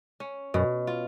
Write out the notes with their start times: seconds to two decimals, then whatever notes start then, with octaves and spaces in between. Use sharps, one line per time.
0.20 C#4
0.54 F#2 B2
0.87 F4